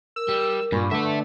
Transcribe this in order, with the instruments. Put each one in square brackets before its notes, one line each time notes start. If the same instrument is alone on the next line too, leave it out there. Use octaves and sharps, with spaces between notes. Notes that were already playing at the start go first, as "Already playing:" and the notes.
[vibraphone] A#4 [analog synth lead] E6
[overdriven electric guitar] G3
[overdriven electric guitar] G2 [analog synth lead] A#2 [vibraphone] B5 C#6 D6
[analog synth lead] D3 [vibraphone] A3 B4 [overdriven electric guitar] A4 E5